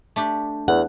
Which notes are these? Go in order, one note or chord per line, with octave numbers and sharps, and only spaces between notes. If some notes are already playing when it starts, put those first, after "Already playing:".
A3 D4 G4
E2 F#5